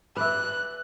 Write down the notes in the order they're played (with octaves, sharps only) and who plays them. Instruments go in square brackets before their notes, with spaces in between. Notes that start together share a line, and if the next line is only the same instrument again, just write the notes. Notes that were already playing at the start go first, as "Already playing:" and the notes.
[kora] B4 D5 E5 [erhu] F#6